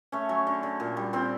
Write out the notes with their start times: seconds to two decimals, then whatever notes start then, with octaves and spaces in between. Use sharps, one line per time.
0.12 A3 C#4 C#5
0.29 F#3
0.47 D3
0.63 D3
0.80 A#2
0.97 G3
1.13 A#2 C4 C5